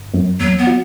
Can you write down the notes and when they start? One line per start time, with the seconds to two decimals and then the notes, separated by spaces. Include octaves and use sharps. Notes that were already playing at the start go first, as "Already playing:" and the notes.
Already playing: G1
0.14 F#2
0.40 E2 F#3
0.58 B3
0.67 F#3